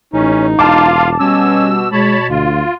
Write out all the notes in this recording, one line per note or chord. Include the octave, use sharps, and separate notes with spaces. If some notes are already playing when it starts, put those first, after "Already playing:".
A1 C#4 D#4
E1 F4 F5 A5 D6
B2 G3 C#4 E6
B2 G#3 C#5 A5 B5
D2 F4